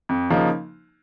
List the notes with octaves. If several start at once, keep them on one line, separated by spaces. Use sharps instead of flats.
F2
C#3 F3 A#3 D#4